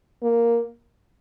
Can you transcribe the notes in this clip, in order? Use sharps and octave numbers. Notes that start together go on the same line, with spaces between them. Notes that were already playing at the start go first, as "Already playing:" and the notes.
A#3